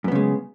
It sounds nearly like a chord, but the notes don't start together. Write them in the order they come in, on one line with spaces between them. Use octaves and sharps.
F#2 B3 C#3 G#3